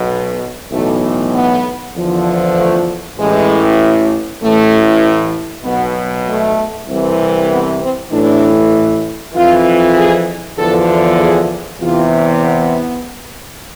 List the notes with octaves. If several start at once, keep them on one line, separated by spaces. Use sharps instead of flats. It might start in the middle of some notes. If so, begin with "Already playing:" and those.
Already playing: B1 B2
B1 A2 E3 A3
B3
E2 D3 F3
A3
A1 A2 E3 G#3
A1 A2 E3 A3
B1 B2 B3
A3
C2 C3 E3
B3
C4
A1 A2 E3 D4
F2 E3 F4
G#4
E2 D3 F3 A4
G#4
E2 C3 E3 F4
B3